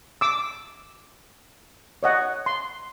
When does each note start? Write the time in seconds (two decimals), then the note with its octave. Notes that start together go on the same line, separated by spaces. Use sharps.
0.21 D6 E6
2.03 C#5 D#5 F#5
2.46 C6